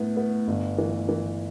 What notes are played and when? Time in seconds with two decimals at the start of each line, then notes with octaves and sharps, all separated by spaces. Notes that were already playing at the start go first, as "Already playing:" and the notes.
Already playing: A2 B3 E4
0.17 B3
0.48 G1
0.78 E3
1.09 E3